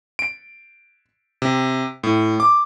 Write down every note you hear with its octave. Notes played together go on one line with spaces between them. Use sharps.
D7
C3
A2
D6